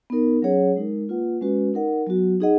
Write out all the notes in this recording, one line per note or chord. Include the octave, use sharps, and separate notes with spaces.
B3 D#4 A#4
F#3 C#4 G#4 C#5 F#5
G#3 D#4 A#4
A#3 F4 B4 F#5
G#3 C#4 F#4 B4
D#4 A#4 D#5 F#5
F#3 B3 F#4
D#4 G#4 D#5 F#5